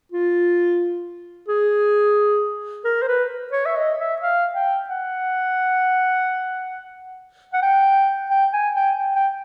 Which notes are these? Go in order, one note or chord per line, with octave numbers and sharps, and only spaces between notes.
F4
G#4
A#4
C5
B4
C#5
E5
D#5
E5
F5
G5
F#5
F#5
G5
G5
G#5
G5
G5
G5